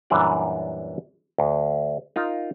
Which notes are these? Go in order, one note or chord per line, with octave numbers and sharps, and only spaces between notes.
F#2 A#2 E3 G3 D4 D5
D2
D#4 F4 A#4